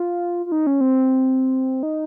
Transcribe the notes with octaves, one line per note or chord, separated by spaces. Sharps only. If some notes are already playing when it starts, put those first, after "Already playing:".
Already playing: F4
F4
D#4
C#4
C4
D#4